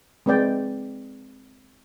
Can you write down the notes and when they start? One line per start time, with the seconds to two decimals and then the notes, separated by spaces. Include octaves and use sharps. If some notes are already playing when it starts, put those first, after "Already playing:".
0.26 G#3 C4 B4 D5 G5